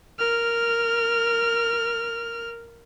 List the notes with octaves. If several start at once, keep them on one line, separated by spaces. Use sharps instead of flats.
A#4 F6